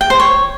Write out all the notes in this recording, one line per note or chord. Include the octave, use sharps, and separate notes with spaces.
G5
C5
C#5